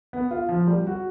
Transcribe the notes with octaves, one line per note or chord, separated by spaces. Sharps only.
B3
F4
F3
G3
F#4